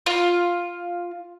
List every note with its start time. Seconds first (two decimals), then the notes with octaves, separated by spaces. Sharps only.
0.06 F4